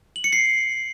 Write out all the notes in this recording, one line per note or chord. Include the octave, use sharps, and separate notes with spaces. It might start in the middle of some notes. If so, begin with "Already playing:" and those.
F#7
C#7
C7